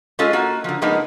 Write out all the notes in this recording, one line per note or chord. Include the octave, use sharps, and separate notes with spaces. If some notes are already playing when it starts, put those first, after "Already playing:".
G#3 C#4 F4 G#4 A4 D#5
A#3 F#4
D3 F3
F3 G#3 A#3 B3 D#4